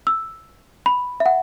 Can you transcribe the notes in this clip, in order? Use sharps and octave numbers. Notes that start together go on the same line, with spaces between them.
E6
B5
E5
F#5